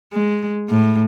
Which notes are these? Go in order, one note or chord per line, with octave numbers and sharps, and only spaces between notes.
G#3
A2